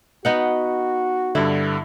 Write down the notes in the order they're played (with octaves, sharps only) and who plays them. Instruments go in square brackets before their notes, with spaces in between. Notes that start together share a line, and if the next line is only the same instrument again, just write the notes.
[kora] B3 D#4 F#5 [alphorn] F#4
[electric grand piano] G2 D3 [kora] E4